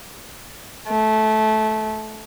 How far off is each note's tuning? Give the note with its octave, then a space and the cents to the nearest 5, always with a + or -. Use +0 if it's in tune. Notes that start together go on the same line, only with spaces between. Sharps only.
A3 -15